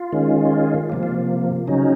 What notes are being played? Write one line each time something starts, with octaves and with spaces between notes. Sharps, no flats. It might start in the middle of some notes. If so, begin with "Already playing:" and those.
Already playing: F4
D#3 G#3 C#4
C3 F3 A#3
F4
C#3 F#3 C#4 D#4